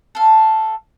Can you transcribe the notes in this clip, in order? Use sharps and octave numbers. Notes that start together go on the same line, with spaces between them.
A4 F5